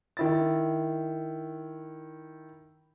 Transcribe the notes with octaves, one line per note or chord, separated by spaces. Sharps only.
D#3 E4 A6